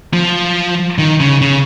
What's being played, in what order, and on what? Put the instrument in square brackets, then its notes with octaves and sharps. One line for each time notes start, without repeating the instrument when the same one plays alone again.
[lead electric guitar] F3
D#3
C#3
C#3